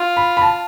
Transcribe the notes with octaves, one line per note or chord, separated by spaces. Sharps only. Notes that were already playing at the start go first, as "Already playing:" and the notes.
Already playing: F4
B5
B5
A5